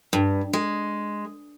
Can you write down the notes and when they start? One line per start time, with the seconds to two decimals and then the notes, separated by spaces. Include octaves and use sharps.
0.13 G2
0.53 G#3